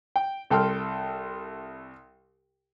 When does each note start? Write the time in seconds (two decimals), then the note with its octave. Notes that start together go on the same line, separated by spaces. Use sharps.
0.16 G5
0.50 C2 A4 G5 C6 F6